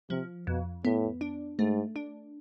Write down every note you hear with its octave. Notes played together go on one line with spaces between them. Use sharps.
C3 F3
F2 B2
A2 B3
D4
G#2 A3
D4